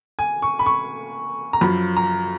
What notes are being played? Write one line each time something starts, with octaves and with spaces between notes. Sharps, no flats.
G#5
C#6
B5
C#6
A#5
F#2 F3 B5
A#5